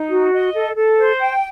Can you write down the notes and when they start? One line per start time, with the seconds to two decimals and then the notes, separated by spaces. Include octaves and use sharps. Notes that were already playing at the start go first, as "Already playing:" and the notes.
Already playing: D#4
0.11 F#4
0.33 D#5
0.55 A4
0.76 A4
0.98 C5
1.19 G5